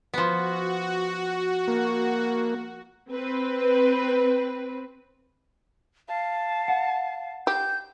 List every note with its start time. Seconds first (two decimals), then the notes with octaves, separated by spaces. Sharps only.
0.14 F3 B3 F#4
1.68 A#3
3.11 C4 B4
6.08 F5 A5
6.68 F#5
7.47 G4 G6